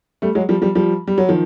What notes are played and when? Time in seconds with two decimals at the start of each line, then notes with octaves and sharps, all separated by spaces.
0.22 G3 A3
0.35 F#3 G#3
0.49 F3 G3
0.62 F3 G3
0.75 F3 G3
1.07 G3
1.18 F#3
1.29 D#3 F3